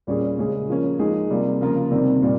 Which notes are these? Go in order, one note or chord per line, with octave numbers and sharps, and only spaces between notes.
A#2 G3 C#4 G#4
C#3 G#3 C#4 G#4
F3 A#3 C#4
F3 G#3 D#4 G#4
C3 G3 A#3 F4
C#3 F3 A#3 F4 A#4
C3 D#3 G3 C4
A#2 G3